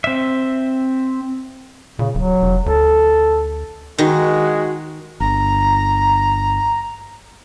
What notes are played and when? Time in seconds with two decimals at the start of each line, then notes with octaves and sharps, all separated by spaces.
0.04 C4 E5
1.99 A#2 C#3
2.15 D1 F#3
2.42 F1
2.66 D2 A4
3.98 D#3 G#3 F#4
5.20 G1 A#5